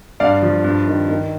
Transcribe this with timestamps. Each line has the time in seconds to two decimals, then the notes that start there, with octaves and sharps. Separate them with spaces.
0.20 G2 D5 F5
0.42 F3
0.64 G2
0.87 D#3
1.09 D#3